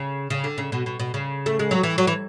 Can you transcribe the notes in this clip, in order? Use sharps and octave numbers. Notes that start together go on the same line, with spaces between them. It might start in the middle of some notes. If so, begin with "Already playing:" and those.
Already playing: C#3
C#3
D3
C#3
B2
B2
B2
C#3
A3
G#3
F#3
E3
F#3
E3